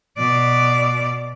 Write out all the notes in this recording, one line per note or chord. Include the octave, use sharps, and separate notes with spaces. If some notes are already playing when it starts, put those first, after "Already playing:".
B2 D5